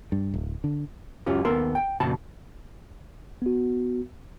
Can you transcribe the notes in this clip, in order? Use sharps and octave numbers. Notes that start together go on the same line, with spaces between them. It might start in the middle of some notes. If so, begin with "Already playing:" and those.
G2
D1
D3
C#2 F#2 C#4 F4 G4
D#2 B3 A4 A#4 C6
G5
F2 A#2 C#3 F#4 A5 B5
B3 F#4